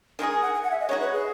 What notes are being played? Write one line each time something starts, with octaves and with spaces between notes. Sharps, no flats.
D#3 G#3 D#4 G#4
G#5
F#5
G#5
F#5
E5
D#5
G#3 D#4 F#4 C#5
B4
G#4